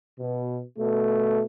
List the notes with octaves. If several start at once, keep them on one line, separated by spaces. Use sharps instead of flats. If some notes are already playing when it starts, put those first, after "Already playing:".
B2
B2 A3